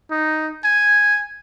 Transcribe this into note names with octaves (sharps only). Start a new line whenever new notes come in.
D#4
G#5